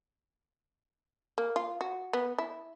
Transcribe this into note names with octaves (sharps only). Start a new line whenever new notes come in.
A#3
F4
F#4
B3
E4